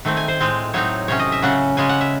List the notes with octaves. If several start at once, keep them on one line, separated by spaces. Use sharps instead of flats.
D#3 A3 C4
G#5
C5
A2 G#3 C4
A2 F#3 C4 D#4 C#5
C3 F#3 C#4 C#5
D#5
E5
C#3 F#3 C#4 F#5
C#3 G#3 C#4 G#5
F#5
E5